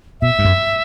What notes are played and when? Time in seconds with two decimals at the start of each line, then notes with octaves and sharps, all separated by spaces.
0.21 B2 E5
0.39 G2
0.45 F#2